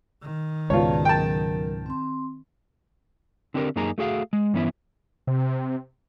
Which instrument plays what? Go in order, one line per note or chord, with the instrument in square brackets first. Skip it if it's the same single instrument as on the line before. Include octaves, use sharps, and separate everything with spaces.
[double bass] D#3
[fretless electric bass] C#2 G#2 B2 [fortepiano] F4 C#5 [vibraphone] B4 D5 A5
[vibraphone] F#3 A#4 [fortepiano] G5 A5
[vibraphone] C4 C6
[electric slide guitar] D3 C4 D4 G4 G#4 A#4
F#2 A#3 D#4 G#4 A#5
A3 F#4 G#4 F5
G#3
G2 E3 B3 C#4 E4
[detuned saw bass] C3